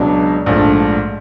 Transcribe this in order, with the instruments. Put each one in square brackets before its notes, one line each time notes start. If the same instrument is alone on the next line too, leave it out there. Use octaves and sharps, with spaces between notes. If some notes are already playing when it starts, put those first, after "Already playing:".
Already playing: [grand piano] C#2 B2 F#3 [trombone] D4
[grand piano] A#1 G#2 F3 A3 [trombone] D4